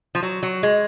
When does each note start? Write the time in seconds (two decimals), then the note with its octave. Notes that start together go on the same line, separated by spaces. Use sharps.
0.15 F3
0.23 F#3
0.43 F#3
0.63 G#3